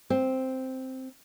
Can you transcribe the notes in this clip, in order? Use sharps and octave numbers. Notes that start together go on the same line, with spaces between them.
C4